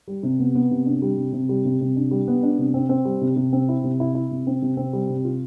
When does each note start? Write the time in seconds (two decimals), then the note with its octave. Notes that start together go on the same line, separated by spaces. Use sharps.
0.08 G3
0.23 C3
0.39 B3
0.55 B3
0.71 C3
0.86 D4
1.02 G3
1.17 C3
1.33 C3
1.49 G3
1.65 C3
1.81 C3
1.96 D4
2.11 G3
2.28 B3
2.43 D4
2.58 C3
2.74 C4
2.89 C4
3.05 G3
3.21 C3
3.36 C3
3.53 C4
3.69 E4
3.84 C3
4.00 E4
4.15 E4
4.31 C3
4.47 C4
4.62 C3
4.77 C4
4.93 G3
5.09 C3
5.25 F4